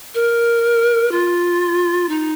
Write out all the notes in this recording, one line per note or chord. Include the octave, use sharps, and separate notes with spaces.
A#4
F4
D#4